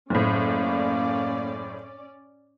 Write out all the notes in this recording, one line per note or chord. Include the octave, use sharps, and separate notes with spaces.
F#1 A2 A#3 C#4 D5